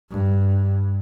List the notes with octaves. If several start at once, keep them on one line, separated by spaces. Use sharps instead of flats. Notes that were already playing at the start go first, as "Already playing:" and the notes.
G2